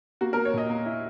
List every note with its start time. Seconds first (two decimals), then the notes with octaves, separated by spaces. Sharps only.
0.21 A#3 F#4
0.33 A#3 A#4
0.45 C#5
0.54 A#2 D#5
0.70 A#3
0.86 E4